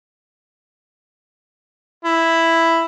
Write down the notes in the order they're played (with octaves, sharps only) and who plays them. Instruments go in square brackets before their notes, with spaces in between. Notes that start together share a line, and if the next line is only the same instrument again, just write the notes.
[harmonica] E4